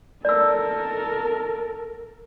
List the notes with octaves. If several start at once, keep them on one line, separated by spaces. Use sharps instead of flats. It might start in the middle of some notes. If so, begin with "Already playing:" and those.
A4 A#4 D5 E6